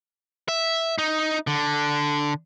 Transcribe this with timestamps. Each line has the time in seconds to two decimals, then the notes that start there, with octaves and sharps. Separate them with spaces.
0.48 E5
0.98 D#4
1.47 D3